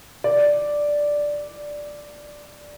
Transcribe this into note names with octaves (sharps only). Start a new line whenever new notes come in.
D5